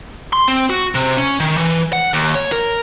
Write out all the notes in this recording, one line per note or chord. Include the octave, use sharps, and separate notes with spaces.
C6
C4
F#4
C3
C#4
D#3
E3
F#5
D#2
C#5
A#4